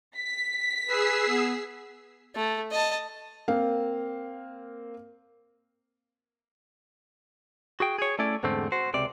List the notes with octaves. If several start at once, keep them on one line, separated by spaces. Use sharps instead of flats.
B6
G#4 B4 E6 C7
B3
A3
D#5 A5
A#3 C4 F5
F#4 G#4 G5
G#4 C#5
A3 C#4 E4 D5
E2 G#2 D3 A3 C4
F#4 C5
C#2 C3 D5